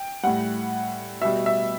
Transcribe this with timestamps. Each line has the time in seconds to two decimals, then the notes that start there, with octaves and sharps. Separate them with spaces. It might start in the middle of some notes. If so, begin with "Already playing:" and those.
Already playing: G5
0.23 A2 G3 F#5
1.21 B2 E5
1.25 G3
1.46 E5